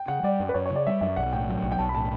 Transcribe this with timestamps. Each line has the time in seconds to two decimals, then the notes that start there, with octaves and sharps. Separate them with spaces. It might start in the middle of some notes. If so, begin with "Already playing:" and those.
Already playing: G5
0.08 C#3 F#5
0.23 G3 D5
0.40 F#2
0.49 B4
0.54 F#2 C#5
0.66 C#5
0.70 C#3
0.76 D5
0.87 G3 E5
1.01 F#2 E5
1.17 B1 F#5
1.33 A2 G5
1.49 F#3
1.63 B1
1.72 G5
1.79 B1 A5
1.89 B5
1.95 A2 A5